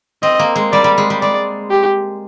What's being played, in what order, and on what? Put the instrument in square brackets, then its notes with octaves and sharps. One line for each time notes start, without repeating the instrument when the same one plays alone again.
[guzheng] C4 [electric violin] D#5
[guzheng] A#3
G#3
[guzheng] G3 [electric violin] D5
[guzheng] G3
G#3
G3
[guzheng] G#3 [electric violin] D5
[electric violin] G4